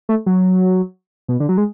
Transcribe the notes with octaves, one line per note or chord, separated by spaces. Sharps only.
A3
F#3
B2
D3
F#3
G#3